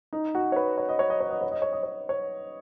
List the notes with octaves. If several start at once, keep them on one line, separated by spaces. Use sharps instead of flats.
D#4
F#4
C#5
B4
C#5
D#5
C#5
D#5
C#5
D#5
C#5
D#5
C#5
D#5
C#5
C#5